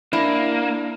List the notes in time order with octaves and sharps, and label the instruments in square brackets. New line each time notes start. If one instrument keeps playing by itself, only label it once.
[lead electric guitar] A#3 [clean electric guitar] D4 [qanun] E4